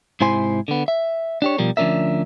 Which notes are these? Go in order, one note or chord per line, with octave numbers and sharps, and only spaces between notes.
G#2 C3 E4 C5 G#5 C6
D3 B3
E5
D4 G4 C#5
B2 F3 G3 A#4
D2 F3 C#4 D4 A#4 E5